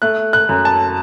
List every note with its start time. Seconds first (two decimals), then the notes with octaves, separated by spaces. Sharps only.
0.02 A3 F#6
0.33 F#6
0.49 F#2
0.65 A5